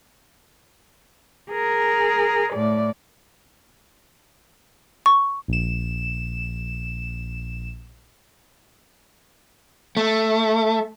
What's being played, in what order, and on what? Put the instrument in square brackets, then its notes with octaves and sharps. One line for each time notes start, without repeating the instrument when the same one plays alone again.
[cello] G#4 A#4
A2 D5
[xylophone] C#6
[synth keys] A#1 E7
[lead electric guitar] A3